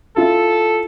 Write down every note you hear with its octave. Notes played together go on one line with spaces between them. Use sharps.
E4 F4 A4 E5